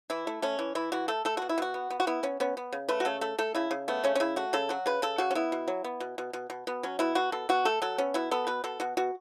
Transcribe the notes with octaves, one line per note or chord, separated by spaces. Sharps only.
E3 E4
A3
A3 C#4
E3
E3 E4
E3 F#4
A3 A4
A3 A4
B2 F#4
E4
B2 F#4
B3
B3
F#4
B3 E4
B3 C#4
B3 C#4
B3
C#3
A3 B4
F#4
C#3 A4
A3 A4
A3 A4
C#3 E4
C#3
A3 B3
C#3 C#4
C#4
C#3 E4
A3 F#4
C#3 A4
F#3 F#4
C#3 B4
C#3 A4
C#3 F#4
C#4
B3 E4
B2
F#3
B3
B2
B2
B2
B2
B2 B3
F#3 C#4
B2 E4
B2 F#4
B2 A4
B2 F#4
A3 A4
F#3 A4
B3 C#4
B2 E4
B3 A4
B2 B4
B2 A4
B2 F#4
B2 F#4